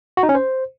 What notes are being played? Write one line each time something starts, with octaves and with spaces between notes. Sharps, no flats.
F#4
D#4
C#4
C5